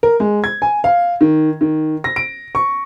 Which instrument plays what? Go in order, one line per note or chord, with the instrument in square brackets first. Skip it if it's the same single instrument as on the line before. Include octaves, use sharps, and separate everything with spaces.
[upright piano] A#4
G#3
G#6
G#5
F5
D#3
D#3
A#6
D7
C#6